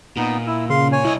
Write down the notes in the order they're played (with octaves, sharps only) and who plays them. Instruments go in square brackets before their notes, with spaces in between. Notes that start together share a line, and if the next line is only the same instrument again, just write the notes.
[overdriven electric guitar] A#2 [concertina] B3 D#4
[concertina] E4 [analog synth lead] E6
[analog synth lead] C#3 [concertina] F5 C6
[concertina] C#5 G#5
[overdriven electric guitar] C2 D#5 [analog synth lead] E4